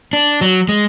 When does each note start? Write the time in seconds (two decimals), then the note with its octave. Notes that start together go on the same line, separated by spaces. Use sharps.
0.13 D4
0.41 F#3
0.69 G#3